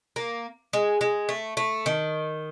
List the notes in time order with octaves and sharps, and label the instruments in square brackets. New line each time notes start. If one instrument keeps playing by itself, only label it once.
[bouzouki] A#3
G#3
G#3
A3
A3
D#3